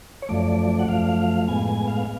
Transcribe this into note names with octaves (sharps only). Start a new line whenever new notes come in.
C#5
F#2 F3 A3 D5
F#5
F#2 F3 A3 F5
A2 G#3 B3 G#5
G#5
F5